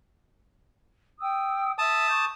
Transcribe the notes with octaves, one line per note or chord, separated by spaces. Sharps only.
G5 D#6 E6
E5 A5 D#6 E6
C#6 D6 G6